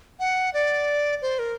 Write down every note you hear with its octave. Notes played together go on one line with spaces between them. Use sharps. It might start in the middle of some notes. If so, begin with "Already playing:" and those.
F#5
D5
C5
A#4